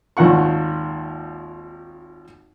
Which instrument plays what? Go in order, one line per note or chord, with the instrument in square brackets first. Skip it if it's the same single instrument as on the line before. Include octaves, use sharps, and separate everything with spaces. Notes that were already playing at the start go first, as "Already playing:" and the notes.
[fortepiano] G#1 D#2 A#2 F#5 C#6